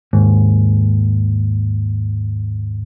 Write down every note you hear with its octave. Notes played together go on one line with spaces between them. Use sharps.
D#2 G#2